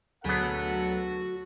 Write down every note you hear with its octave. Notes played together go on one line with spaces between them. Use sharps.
D2 F#3 B3 F#4 G#4 A4 F#5 B5